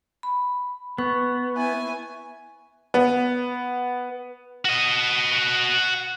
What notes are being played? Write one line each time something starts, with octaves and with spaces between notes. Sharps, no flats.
B5
B3 C#6
E4 G#5
B3
F#4 D#5